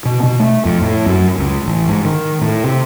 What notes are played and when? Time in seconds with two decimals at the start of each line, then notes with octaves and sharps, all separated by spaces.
0.05 B2
0.23 B2
0.39 A3
0.65 F2
0.82 A2
1.06 F#2
1.38 C#2
1.66 A1
1.88 G#2
2.05 D#3
2.41 A2
2.64 C3